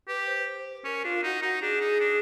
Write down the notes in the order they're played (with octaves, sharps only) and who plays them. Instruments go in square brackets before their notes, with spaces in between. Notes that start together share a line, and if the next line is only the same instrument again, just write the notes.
[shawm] G4 [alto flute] B4
[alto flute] C5
C5
[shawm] C#4 [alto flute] A#4
[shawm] D4 [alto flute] F4
[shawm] D#4 [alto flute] F#4
[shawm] D#4 [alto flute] F#4
[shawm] D4 [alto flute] G#4
[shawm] D#4
D4